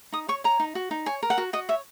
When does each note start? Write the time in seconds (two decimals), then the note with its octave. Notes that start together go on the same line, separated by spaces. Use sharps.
0.13 D#4 D#6
0.28 C#5 C#6
0.44 C#5 A#5
0.60 D#4
0.75 F#4
0.91 D#4
1.06 C#5 G#5
1.23 A#4
1.30 F#5
1.38 F#4
1.53 F#4 D#5
1.69 C#5 E5